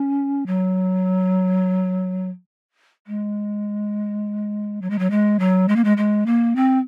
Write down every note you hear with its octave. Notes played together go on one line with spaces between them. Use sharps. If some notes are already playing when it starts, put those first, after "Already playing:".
Already playing: C#4
F#3
G#3
F#3
G#3
F#3
G#3
F#3
G#3
A#3
G#3
G#3
A#3
C4